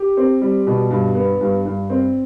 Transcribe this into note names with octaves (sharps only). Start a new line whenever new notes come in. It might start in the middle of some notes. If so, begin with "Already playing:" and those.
Already playing: G4
C4
G3
B2
G2
B3
G2
G2
C4